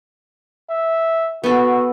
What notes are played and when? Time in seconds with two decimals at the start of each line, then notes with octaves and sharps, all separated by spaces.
0.69 E5
1.44 B3 F#4 A4